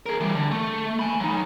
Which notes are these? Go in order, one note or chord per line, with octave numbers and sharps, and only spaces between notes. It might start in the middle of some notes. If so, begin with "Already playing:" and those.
G#4 A#4
E3 G3
D3
A3
G#5 B5
F#3 D#4